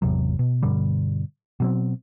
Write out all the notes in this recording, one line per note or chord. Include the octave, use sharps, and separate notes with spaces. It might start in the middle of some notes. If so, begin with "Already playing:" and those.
G#1 E2 C3 F#3
B2
G2 B2 D3 G3
B2 F#3 C4